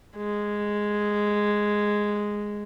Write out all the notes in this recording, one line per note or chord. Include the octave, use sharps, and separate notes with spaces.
G#3